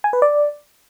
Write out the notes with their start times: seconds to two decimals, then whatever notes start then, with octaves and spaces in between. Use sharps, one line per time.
0.04 G#5
0.13 B4
0.22 D5